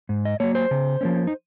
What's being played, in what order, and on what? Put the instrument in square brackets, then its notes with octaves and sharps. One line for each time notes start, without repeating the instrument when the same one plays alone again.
[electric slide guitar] G#2
D#5
F#3 A#3 C#5
C5
C#3
F3 A#3 C#4
D#4